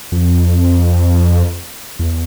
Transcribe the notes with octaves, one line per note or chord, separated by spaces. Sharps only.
F2
E2